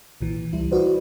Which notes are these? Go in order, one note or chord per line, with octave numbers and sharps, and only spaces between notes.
B1 A#2 E3
C#2 E3 G3 E4
D#4 E4 F#4 B4 C5 D5